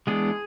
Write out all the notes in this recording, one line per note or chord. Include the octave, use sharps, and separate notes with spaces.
E3 G#3 B3 D4 G#4